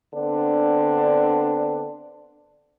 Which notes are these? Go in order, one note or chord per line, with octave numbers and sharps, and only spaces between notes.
D3 B3 C4 D4